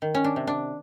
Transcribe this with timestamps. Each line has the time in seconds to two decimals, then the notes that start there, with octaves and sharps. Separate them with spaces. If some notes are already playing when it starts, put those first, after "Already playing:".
0.02 D#3
0.15 C#4
0.24 D4
0.36 C3
0.47 D4